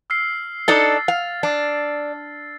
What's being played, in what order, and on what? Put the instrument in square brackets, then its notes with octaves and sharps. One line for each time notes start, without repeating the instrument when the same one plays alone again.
[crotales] E6 F6 C7
[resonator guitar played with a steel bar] D4 D#4 A4 [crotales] A6
[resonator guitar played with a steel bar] F5
D4